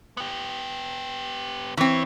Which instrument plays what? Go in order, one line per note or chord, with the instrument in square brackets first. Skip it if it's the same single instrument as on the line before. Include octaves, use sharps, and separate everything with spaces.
[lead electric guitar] B3 G4
[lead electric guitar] D#2 C#5 [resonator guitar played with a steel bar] E3 C4